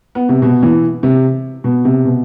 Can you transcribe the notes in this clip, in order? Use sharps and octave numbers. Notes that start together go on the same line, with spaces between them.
B3
C3
B2
E3
C3
B2
C3
B2